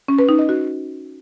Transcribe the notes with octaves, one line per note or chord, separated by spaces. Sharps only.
C#4
B4
D#4
D#5
F#4